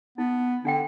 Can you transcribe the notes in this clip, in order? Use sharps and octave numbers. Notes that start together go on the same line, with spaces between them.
B3 D#4
D3 D4 F#5 G5